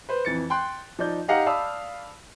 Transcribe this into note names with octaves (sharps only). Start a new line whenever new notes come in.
B4 C5
F2 E3 A6 C#7
G5 C6 F#6
F3 D#4 D5 G6
D#4 G4 D#5 F5 F#5 A#5
D5 F5 A5 B5 D#6 E6